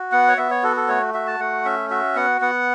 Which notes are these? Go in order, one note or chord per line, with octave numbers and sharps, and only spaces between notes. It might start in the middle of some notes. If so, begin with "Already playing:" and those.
Already playing: F#4
B3 F#5
C#5
B3 E5
C#5
F#4 A4
A4
A3 C#5
F#4 E5
A5
A3 F#5
C#4 E5
F#4 E5
B3 F#5
B3 F#5